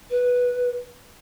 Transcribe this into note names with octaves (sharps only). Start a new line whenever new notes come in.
B4